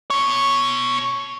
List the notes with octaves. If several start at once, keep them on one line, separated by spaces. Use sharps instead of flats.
B2 C#5